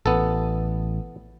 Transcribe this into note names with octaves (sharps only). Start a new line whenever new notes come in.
A1 B3 A4